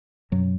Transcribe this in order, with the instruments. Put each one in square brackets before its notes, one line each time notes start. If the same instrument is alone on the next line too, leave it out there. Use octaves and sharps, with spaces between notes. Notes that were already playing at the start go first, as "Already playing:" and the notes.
[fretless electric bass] F#2 B2 F#3